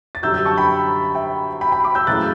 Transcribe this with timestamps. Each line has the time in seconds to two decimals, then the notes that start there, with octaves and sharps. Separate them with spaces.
0.15 A6
0.23 F#2 D3 G3 E6 G6
0.34 E6 G6
0.45 A5 C#6
0.58 G5 B5
1.15 E5 G5
1.61 G5 B5
1.72 G5 B5
1.84 B5 D6
1.95 E6 G6
2.07 F#2 C#3 E3 A3 F#6 A6